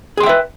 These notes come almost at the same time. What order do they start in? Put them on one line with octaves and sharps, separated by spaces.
G#4 C6 G5 E5 B4